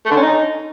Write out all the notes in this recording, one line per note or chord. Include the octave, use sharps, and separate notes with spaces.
A3
D3
C#4
D#4